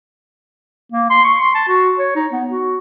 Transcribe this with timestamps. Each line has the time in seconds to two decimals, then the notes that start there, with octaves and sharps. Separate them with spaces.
0.92 A#3
1.10 C6
1.24 C#6
1.41 C6
1.55 A5
1.68 F#4
1.99 C#5
2.15 D#4
2.31 B3
2.49 F#4